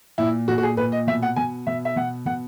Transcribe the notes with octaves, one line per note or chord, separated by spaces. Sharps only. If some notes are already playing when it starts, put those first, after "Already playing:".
A#2 E4
A#2 F#4
F#4
G#4
A#2 B4
D#5
B2 E5
F#5
B2 G#5
B2 E5
E5
B2 F#5
B2 F#5